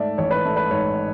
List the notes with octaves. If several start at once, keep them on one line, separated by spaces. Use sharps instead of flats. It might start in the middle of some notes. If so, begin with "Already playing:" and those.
Already playing: G#2 A3 D5 E5
A1 C#5
B4
A3
B4
G#2 C#5